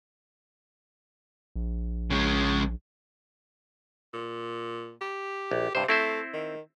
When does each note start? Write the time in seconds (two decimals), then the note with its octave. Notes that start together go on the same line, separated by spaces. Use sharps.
1.56 A#1
2.10 C#3 G#3
4.14 A#2
5.01 G4
5.51 A#1
5.75 G2 C3 C5
5.88 A3 C4 E4 C5
6.34 D#3